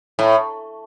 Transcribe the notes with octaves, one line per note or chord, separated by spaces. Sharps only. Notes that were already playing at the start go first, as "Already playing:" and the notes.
A2